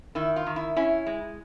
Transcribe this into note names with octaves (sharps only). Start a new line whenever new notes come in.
D#3 E4
F4
D#3
E4
C#4 E4
G#3